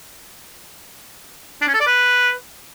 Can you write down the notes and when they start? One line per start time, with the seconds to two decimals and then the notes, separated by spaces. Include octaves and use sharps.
1.61 D4
1.68 C#4
1.74 A4
1.80 D5
1.86 B4